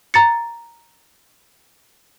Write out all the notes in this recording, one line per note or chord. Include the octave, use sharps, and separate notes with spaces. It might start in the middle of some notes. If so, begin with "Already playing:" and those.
A#5 A6 C#7